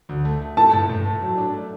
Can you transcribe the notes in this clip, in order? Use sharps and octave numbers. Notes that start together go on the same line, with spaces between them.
D2
A3
A3
A3 A5
A2
A2
A3
F#3
D4
A3